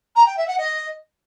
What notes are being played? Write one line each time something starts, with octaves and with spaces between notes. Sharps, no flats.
A#5
G5
E5
F#5
D#5